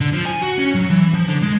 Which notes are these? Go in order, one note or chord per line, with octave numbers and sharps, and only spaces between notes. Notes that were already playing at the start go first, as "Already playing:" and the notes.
D3
F3
G#5
F#4
C#4
F#3
E3
F3
D3
G#3